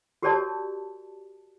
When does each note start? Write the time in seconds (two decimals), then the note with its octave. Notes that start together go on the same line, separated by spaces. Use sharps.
0.22 F#4 G4 A#4 C#5 D5 A5